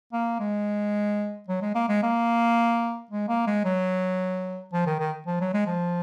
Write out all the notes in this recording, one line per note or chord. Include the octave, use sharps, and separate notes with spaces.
A#3
G#3
F#3
G#3
A#3
G#3
A#3
G#3
A#3
G#3
F#3
F3
D#3
D#3
F3
F#3
G#3
F3